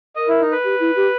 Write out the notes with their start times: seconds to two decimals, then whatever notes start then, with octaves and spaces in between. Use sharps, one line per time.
0.16 A#4 D#5
0.28 E4
0.41 D#4
0.52 B4
0.64 G4
0.80 E4
0.96 G4